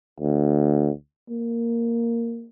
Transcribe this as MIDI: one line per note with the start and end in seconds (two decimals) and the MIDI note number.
0.20 0.90 38
1.30 2.48 58